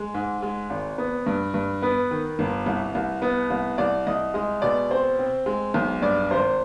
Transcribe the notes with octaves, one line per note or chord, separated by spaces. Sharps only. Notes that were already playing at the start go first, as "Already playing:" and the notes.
Already playing: G#3
G#2
G#3
G#1
B3
G2
G2
B3 B4
D#3
G1
C2
C2
B3
C2
C2 D5
C2 D#5
G#3 D#5
B2 D5
C4 C5
C4
G#3
B1
G2 D5
G#1 C5